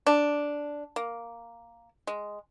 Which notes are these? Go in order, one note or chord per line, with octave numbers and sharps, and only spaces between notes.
D4
A#3
G#3